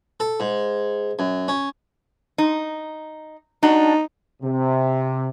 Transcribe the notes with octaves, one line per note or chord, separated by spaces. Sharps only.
A4
G#2
F#2
C#4
D#4
D4 D#4 F#4
C3